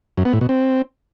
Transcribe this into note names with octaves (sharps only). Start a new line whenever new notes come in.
F#2
B3
A2
B2
C4